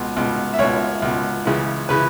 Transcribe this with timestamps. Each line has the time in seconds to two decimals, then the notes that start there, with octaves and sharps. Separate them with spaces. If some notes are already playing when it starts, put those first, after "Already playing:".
Already playing: C#2 B2
0.17 C#2 B2
0.54 E5
0.59 C#2 B2 C#5
1.02 C#2 B2
1.45 C#2 C#3 E3
1.89 C#3 E3 B4